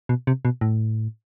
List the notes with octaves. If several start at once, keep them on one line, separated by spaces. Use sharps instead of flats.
B2
C3
B2
A2